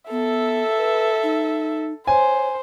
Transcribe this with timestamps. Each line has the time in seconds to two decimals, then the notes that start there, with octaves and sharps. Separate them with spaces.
0.11 B3 A4 E5
0.78 B4
1.23 D#4
2.07 C5 C#5 G#5